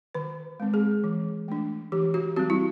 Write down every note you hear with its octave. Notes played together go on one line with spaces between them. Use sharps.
D#3 B4
G#3 C4
G#4
E3
A3 D4
E3 G4
F#4
G3 C4 F#4
E4